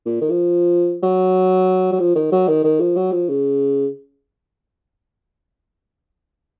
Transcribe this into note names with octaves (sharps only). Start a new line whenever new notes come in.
A#2
D#3
F3
F#3
F#3
F3
D#3
F#3
D#3
D#3
F3
F#3
F3
C#3